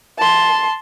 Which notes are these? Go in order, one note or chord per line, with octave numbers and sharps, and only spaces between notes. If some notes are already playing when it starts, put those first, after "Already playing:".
A5 C6